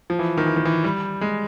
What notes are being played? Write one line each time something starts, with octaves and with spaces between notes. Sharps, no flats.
F3
E3
D#3
E3
D#3
E3
G3
G#3